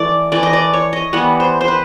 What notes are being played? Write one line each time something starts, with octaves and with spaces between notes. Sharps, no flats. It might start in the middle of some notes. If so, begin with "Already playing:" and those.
Already playing: E3 A3 D5
E3 A3 D5
D#5
D5
C#5
D#5
E3 G3 B3 F#5
C5
C5
B4